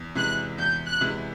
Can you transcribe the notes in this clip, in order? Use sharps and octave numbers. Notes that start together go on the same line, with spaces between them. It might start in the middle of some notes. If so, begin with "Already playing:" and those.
Already playing: E2
C3 E3 G#3 F#6
E2 G6
F#6
C3 E3 G#3